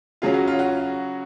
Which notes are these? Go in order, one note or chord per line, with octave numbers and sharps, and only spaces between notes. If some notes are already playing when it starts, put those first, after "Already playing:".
C#3 F#3 C#4 F4 G#4
F#4
F4
F#4